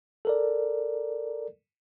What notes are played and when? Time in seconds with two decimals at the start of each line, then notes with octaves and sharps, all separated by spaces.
0.25 A4 A#4 D5